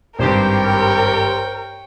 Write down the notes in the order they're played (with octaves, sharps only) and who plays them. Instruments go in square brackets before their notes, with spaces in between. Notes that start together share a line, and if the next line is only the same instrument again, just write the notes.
[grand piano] G#1 G2 [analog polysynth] G4 C5 [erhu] A#4 [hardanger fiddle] C#5 G5